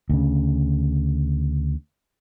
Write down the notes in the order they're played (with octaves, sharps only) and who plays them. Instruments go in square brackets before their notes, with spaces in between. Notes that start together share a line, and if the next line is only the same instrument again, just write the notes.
[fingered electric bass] D2 C#3